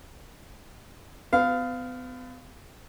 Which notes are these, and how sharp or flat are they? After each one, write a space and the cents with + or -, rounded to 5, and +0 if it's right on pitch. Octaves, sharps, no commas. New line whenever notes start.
B3 +40 F5 +0